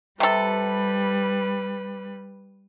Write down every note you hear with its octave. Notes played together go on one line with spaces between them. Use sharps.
C3 G3 A4 B4